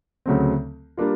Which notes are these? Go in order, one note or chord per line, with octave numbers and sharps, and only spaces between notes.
D2 C#3 F#3 A3 C4
G3 A#3 D4 F4